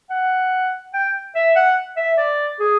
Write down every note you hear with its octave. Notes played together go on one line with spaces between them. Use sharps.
F#5
G5
E5
F#5
E5
D5
G#4